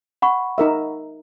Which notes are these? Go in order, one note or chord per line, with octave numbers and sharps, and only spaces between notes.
F#5 B5 C#6
D#4 A#4 E5